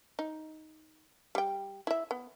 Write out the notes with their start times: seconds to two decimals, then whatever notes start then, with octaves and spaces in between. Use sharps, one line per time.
0.19 D#4
1.35 G3 G5
1.87 E4 E5
2.11 B3